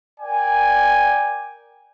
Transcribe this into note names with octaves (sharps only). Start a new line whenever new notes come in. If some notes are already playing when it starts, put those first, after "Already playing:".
A#4 D5 G5 G#5